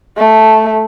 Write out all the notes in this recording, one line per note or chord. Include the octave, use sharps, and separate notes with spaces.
A3